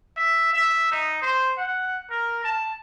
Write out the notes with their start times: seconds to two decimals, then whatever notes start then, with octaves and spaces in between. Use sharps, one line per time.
0.17 E5
0.53 E5
0.92 D#4
1.22 C5
1.58 F#5
2.10 A#4
2.44 A5